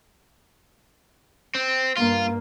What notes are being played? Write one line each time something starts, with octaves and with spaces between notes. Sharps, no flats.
C4
G2 A#3 F4